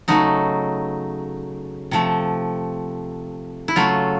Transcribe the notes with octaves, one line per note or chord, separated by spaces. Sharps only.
C#3 F#3 A3 D#4
C3 F3 A3
E4
C#3 F#3 A3 F4